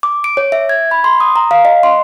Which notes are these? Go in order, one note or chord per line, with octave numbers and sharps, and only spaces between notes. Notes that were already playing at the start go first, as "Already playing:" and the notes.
D6
D7
C#5
E5
G#6
B5
C6
D#6
A#5
F5
D#5
C6